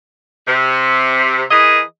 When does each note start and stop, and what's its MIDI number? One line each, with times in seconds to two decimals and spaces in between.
0.48 1.43 48
1.50 1.80 52
1.50 1.80 68
1.50 1.80 70
1.50 1.80 75